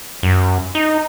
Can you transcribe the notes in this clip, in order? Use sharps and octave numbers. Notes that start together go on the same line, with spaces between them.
F#2
D#4